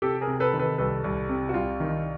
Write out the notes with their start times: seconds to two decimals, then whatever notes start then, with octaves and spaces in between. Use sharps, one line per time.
0.02 C3 G4 A4
0.21 G#4 A#4
0.27 C3
0.40 A4 B4
0.53 D#3
0.59 A4 B4
0.78 C2 A4 B4
1.04 C2
1.29 C3
1.49 F#4
1.54 C2 F4
1.80 D#3